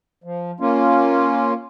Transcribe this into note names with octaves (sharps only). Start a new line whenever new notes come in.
F3
A#3 C#4 F4